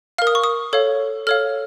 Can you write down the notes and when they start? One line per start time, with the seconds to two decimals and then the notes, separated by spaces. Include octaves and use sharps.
0.18 A#4 F5 F6
0.27 D#6
0.35 C#6
0.44 D#6
0.73 A4 C#5 F5
1.27 A4 C#5 F5 F6